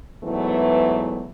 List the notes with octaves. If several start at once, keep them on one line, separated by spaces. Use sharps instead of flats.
E2 G#2 E3 F#3 A3 B3